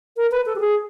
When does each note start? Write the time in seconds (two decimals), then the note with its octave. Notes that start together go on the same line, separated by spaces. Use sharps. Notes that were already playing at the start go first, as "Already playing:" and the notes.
0.17 A#4
0.32 B4
0.46 A4
0.56 G4
0.60 G#4